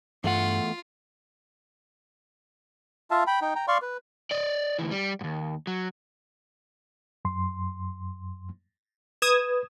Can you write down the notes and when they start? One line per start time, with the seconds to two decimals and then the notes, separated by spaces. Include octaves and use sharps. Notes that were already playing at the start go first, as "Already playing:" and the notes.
0.24 E2 G2 A3 F4 F#5
3.11 F4 E5 F5 A5
3.27 G5 B5
3.42 D#4 G5
3.56 G5 A#5
3.68 D5 F5 C6 C#6
3.82 B4
4.31 D5 D#5
4.79 D2 E3
4.91 G3
5.21 D#2 G#2
5.67 F#3
7.25 F#2 C6
9.22 B4 D#6 G#6 E7